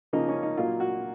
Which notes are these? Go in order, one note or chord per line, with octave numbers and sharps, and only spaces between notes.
C#3 F3 A#3 D#4
C#4
D#4
A#2 F#3 A#3 F4
F#4